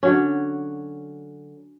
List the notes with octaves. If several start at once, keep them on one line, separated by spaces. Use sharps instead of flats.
D3 F#3 C#4